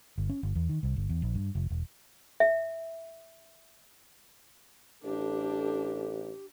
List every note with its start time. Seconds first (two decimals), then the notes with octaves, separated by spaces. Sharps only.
0.18 G1
0.29 C#4
0.43 G1
0.55 E2
0.69 D#3
0.83 C2
0.96 G1
1.09 E2
1.22 A#1
1.35 G2
1.55 F1
1.70 E1
2.40 E5
5.04 A1 D4 G4 A4